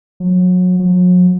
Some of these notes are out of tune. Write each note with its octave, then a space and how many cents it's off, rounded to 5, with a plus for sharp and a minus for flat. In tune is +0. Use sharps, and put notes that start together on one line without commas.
F#3 -30
F#3 -45